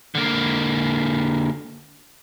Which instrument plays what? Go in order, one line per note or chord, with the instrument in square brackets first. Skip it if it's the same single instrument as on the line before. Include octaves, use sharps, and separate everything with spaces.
[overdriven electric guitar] D3 A#3